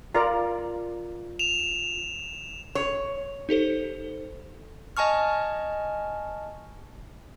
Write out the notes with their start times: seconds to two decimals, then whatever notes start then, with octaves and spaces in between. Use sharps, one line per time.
0.15 F4 A#4 D5 A#5
1.39 E7 F7
2.75 C#5
3.49 D#4 G4 A4 C5
4.97 D#5 G#5 A5 C#6 F6